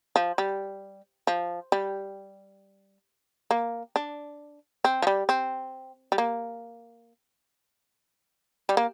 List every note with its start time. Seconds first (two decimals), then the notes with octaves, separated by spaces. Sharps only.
0.16 F3
0.38 G3
1.27 F3
1.72 G3
3.51 A#3
3.96 D4
4.85 C4
5.02 F3
5.07 G3
5.29 C4
6.12 G3
6.18 A#3
8.69 G3
8.77 A#3